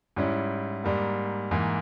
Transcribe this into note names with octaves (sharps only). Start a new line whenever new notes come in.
G#2 G3 C#4 E4
G#2 G3 A#3
G#2 E3 A#3